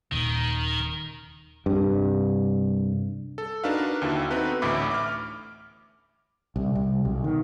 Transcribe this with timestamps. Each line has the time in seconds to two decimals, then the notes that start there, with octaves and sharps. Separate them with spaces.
0.12 D#1 D#3
1.66 C2 G2
3.38 A4
3.64 D4 D#4 F#4 A#4 B4 F5
4.02 D#2 D3 E4 F#4 A5
4.31 B3 C4 D#4 F#4 A4 B4
4.62 A1 D2 A2 E4 B5 D6
4.91 D6 F6
6.56 C2
6.75 C2
7.05 B1
7.24 D#3